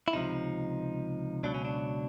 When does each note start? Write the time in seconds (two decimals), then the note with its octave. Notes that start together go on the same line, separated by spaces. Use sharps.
0.08 E4
0.13 C#2 C3 F3 D#4
1.43 C#2 B2 F#3 D4
1.54 C#4
1.65 D4